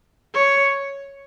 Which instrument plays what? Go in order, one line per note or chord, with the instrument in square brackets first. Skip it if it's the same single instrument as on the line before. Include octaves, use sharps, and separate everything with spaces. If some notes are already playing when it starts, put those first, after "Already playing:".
[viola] C#5